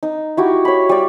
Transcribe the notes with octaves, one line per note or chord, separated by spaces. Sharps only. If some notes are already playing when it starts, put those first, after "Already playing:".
D#4
E4 F#4 G4
C#5 B5
G3 D5